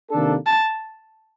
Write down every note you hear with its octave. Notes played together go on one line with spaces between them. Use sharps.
C3 D#3 A#3 D4 A4
A5